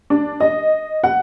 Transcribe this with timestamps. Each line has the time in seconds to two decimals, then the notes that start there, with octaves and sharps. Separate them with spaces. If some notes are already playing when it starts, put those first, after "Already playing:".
0.10 D4
0.40 D#5
1.04 F#5